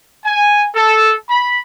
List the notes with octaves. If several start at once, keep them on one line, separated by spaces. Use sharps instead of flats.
G#5
A4
B5